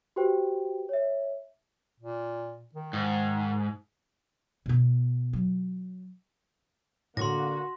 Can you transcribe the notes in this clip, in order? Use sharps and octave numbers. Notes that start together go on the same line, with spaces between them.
F#4 G4 B4 C5 G5
C#5 E5
A#2
D#3
G#2
B2 B3
F#3
A2 D3 A#3 F#4 C6 C#6 A#6